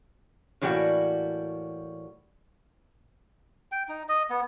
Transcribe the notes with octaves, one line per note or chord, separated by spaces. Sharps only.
A2 E3 G3 A#3 F#4
G5
D#4
D#5
B3